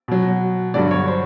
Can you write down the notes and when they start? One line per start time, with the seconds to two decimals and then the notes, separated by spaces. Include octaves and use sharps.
0.08 B2 F#3
0.74 G2 D3 F#3 D5
0.91 C#5
1.08 C5